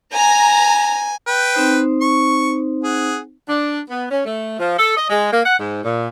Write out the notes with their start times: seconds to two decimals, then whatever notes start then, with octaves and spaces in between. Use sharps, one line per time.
0.13 G#5 A#5
1.27 B4 G5
1.54 C4 D#4 C5
2.01 C#6
2.84 G#4 F#5
3.47 D4
3.89 B3
4.10 C#4
4.25 A3
4.59 F3
4.77 A4
4.97 D#5
5.09 G#3
5.32 A#3
5.44 F#5
5.59 G#2
5.82 A#2